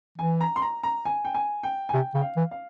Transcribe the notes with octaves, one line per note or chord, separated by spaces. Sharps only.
E3 G#5
A#5
C6
A#5
A#5
G#5
G5
G#5
G5
G#5
C3 G5
C#3 G5
F5
E3
F5